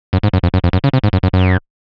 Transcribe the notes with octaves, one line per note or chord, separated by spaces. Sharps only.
F#2
G#2
F#2
F2
F#2
F2
F#2
C#3
C3
G#2
F#2
F#2
F#2